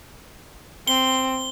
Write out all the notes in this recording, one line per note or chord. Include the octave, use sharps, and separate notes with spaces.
C4 G7